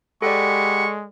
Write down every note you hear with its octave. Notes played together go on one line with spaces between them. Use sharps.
G#3 G4 A4 D5 F#5 B5 C#6